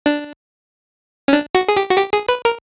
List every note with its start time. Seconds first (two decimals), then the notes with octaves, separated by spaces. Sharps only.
0.06 D4
1.28 C#4
1.33 D4
1.55 F#4
1.68 G#4
1.77 G4
1.90 F#4
1.98 G4
2.13 G#4
2.29 B4
2.45 A#4